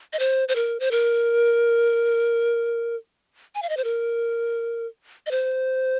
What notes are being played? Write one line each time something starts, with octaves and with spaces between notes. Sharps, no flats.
D#5
C5
C5
A#4
C5
A#4
G#5
F5
D#5
C5
A#4
D#5
C5